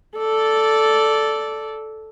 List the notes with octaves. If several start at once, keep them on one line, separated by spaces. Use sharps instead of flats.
A4 D5